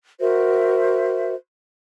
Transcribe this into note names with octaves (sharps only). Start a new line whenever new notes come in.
F#4 A#4 C5 E5